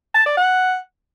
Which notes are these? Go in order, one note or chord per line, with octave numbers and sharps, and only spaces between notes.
A5
D5
F#5